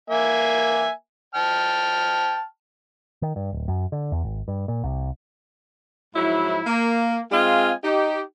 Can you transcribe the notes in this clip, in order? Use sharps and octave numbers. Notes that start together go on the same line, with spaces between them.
A#3 E5 G#5
G5 A5 F6
D#3
G2
D1
F#2
D3
E2
G#1
G2
A#2
C2
G#2 F3 F#3 E4
A#3
G#3 C4 F4 D#5 F5 G#5
D#4 G4